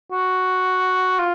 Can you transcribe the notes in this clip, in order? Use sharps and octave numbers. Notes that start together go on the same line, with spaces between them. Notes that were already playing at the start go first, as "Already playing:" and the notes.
F#4
F4